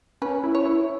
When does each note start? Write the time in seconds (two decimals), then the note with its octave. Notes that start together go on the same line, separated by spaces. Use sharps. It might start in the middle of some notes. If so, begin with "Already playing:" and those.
0.22 C#4 B4
0.44 E4
0.55 C#5
0.65 E4